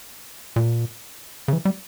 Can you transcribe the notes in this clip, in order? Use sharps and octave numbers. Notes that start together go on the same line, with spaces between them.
A#2
C#3
E3
G3